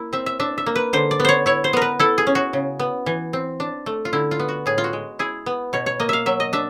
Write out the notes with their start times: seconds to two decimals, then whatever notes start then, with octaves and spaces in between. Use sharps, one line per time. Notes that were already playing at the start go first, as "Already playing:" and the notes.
Already playing: A#3 E4
0.13 C4 E5
0.26 E5
0.40 D4 E5
0.58 E5
0.66 A#3
0.76 B4
0.93 D3 C5
1.11 D5
1.20 B3
1.25 C5 C#5
1.46 E4 C#5
1.64 C5
1.73 B3 A#4
1.82 B4
1.99 E4 A4
2.18 G#4
2.27 C#4
2.35 F#4
2.53 C#3
2.79 B3
3.06 E3
3.33 C4
3.60 D4
3.86 A3
4.05 F4
4.13 D3 E4
4.31 F4
4.40 B3
4.48 F#4
4.66 A2 G#4
4.78 F4
4.84 F#4
4.93 G#3
5.19 E4 G#4
5.46 B3
5.73 B2 C#5
5.86 C#5
6.00 A#3 D#5
6.09 E5 F5
6.26 F#3 E5
6.40 D#5
6.53 D4 E5